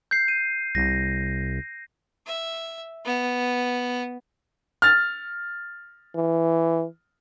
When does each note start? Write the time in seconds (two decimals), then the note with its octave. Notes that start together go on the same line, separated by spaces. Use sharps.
0.11 G6 C7
0.28 D#7
0.75 C2 A#6
2.27 E5
3.05 B3
4.82 F6 A6
6.15 E3